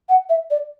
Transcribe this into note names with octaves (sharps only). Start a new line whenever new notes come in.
F#5
E5
D5